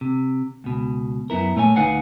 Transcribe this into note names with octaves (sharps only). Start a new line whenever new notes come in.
C3
C#2 B2
F#2 B3 E4 A#4
A#2 A3 C#5 D#5 G#5
D2 D#4 B4 F5 F#5 G#5